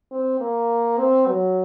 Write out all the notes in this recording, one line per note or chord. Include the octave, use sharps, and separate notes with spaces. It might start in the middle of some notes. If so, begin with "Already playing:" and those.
C4
A#3
C4
F#3